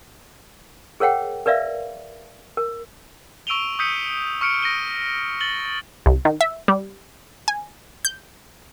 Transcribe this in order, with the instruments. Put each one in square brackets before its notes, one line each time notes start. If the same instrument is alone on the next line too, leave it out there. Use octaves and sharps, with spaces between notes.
[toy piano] G#4 A#4 C#5 F#5 G5
A#4 B4 D5 E5 F5
A#4
[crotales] C#6 E6 D7 D#7 F7 G7
D#6 E6 G6 B6 C#7 D#7
C#6 F6 C#7 D7
A#6 D7 D#7 G7
A6 F#7 G7
[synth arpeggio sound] C2
D#3
E5
G3
G#5
G6